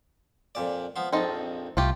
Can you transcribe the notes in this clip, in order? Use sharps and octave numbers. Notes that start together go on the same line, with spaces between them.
F2 A#2 D5
F3 B3 C6
A#1 F2 C4 D#4 A5
C2 A3 F4 G4